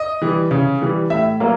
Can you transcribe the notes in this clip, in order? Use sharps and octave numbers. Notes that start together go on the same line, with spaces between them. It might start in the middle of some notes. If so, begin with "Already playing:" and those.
Already playing: D#5
E3 G3
C#3
E3 G3
A2 E5
F#3 A#3